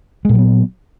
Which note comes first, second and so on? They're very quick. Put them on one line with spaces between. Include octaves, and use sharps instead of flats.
G#3 A#2 F#3 B3